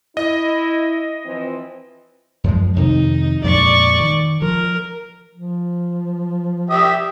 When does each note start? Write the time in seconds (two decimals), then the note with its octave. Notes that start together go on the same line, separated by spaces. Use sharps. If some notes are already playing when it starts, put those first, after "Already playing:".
0.17 E4 D#5
1.25 E3 F3 C4
2.44 F#2 F3 G#3
2.76 F2 C3 D#3 D#4
3.44 F2 A#2 G#3 D5 C#6
4.00 D#3
4.42 F3 A#4
5.35 F3
6.70 G4 E5 D#6